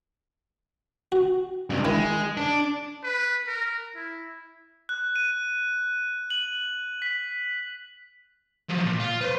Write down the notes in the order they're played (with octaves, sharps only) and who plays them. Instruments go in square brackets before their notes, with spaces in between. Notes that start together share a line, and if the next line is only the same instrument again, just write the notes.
[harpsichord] F#4
[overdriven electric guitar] C#2 G2
[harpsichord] D#3 E4 [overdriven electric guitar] G#3
[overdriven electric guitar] D4
[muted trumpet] B4
A#4
E4
[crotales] F#6
D#7
F#7
B6
[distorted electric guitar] F3 F#3
A#2
F4
B4 C5